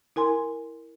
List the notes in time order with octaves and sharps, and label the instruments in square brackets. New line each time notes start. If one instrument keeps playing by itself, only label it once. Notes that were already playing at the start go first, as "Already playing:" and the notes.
[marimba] E4 A#4 G#5 C6